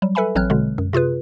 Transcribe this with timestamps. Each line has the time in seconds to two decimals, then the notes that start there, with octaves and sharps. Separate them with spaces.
0.02 F#3 G3
0.15 A4 B4 E5 G#5 B5
0.35 A1 F#3 C4 C#5 F6 F#6
0.50 B2 D3 G#3
0.78 F#2
0.93 C3 F4 G#4 B4